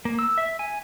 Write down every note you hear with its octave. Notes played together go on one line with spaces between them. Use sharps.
A#3
E6
E5
G#5